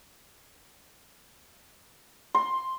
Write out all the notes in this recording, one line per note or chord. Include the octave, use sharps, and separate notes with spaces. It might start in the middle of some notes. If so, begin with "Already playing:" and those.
C6